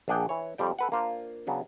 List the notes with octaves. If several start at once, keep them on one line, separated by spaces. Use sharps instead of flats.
A#1 D4 G#4 F#5 G5
E3 C#5
F2 G3 G5
A4 B4 F#5
A#3 D4 F4 C5
C#3 F#3 B3 D4